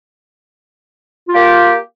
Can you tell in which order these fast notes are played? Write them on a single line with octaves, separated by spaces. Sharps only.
F4 G4 A#3